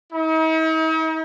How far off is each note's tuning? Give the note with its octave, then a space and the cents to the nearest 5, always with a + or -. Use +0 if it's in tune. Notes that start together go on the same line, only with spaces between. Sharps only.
D#4 +45